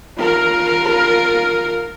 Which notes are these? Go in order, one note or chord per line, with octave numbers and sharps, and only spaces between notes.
F4 A#4